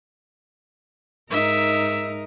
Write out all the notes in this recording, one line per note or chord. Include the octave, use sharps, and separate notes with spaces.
G#2 D#4 A#4 E5